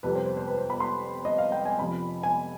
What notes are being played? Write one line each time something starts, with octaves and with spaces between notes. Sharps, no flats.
F2 C3 G3 B4
C5
C5
C5
B4
C5
B5
C6
D#5
F5
G5
G#5
F2 C3 F3 B5
G#5